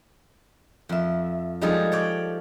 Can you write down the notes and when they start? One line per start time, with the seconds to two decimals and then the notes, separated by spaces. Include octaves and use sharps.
0.89 F2 E5
1.61 F3 G3 G#3 D#4 G#4 A4
1.92 C#5 D5 G5